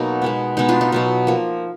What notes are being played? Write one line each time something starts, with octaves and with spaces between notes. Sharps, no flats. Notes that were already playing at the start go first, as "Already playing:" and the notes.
Already playing: B2 F#3 A#3 D#4
B2 G#3 B3
B2 G#3 B3 D#4
D4 F4
D#4
B2 F#3 B3
F3 A#3